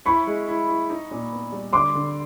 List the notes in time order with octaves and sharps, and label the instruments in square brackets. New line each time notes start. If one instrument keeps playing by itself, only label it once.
[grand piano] E4 [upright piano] B5 C#6
[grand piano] G#3
E4
E4
D#4
A#2
B3
G3
[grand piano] D3 [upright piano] C6 D6
[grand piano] D3